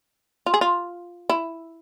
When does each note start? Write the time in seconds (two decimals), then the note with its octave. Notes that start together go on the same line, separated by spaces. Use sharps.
0.46 F4
0.54 G#4
0.61 F4
1.30 E4